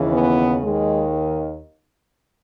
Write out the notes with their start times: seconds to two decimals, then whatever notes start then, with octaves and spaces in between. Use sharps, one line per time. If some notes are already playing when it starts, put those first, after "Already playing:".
Already playing: D#2 C#3 E3
0.12 B3
0.62 D#2 D#3 G#3